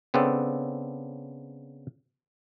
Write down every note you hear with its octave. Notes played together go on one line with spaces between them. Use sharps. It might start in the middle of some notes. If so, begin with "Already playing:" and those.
C#3 B3 C4 D4 A4